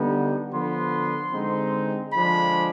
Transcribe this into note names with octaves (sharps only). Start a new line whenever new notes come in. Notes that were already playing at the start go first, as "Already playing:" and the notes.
Already playing: D3 G3 B3 D#4
D3 F3 B3 C6
D3 G#3 C4 D#4
D3 F3 G#3 D4 B5